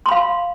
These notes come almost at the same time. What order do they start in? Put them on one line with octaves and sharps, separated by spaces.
C6 B5 F5